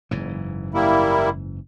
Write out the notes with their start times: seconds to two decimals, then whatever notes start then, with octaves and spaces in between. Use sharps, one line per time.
0.11 F#1 G#2 E3
0.74 G3 A#3 E4